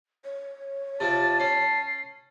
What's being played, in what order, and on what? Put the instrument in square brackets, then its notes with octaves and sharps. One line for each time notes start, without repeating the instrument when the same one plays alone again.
[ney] C#5
[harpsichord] C3 F3 [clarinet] A5 [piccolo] A6
[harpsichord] C#4 [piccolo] C7